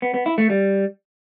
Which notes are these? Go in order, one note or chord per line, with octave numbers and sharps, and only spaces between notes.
B3
B3
E4
A3
G3